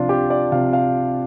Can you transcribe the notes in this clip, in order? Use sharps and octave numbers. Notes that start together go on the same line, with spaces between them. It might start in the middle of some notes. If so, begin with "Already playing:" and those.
Already playing: C3 F3 D4 F4
G4
D5
C3 F3 F5
F5